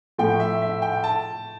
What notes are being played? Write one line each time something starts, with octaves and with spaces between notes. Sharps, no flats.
A2 F3 A3 G5
E5
E5
G5
A5